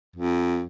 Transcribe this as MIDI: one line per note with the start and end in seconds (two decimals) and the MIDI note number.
0.16 0.64 41